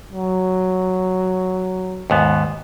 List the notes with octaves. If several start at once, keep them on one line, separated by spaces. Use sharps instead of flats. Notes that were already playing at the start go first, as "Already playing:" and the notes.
F#3
D#2 G#2 B3